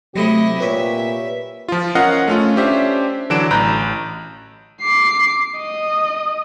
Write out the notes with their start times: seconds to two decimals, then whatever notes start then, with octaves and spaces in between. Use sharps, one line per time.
0.15 C3 F#3 A3 E4 G4 D#5
0.60 A#2 B4 C#5 E5 B6
1.68 F3 F4
1.95 C#4 F4 A#4 D#5 F5 F#5
2.28 A3 C#4 F4
2.56 C#4 D4 G4 C5 E5
3.30 D3 E3 F#3 D4 D7 E7
3.50 A1 A#5 B5 F#6 G6
4.82 D6 C7
5.59 D#5